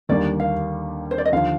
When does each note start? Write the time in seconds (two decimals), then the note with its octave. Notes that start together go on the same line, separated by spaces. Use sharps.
0.09 D#2 D3 G3 A#3 D5
0.40 F5
1.11 C5
1.18 D5
1.25 D#5
1.32 D#2 D3 F3 F5